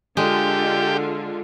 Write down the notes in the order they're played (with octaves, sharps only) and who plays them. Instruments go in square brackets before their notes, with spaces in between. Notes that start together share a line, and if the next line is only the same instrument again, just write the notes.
[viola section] D3 F4 [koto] G#3 [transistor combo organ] G4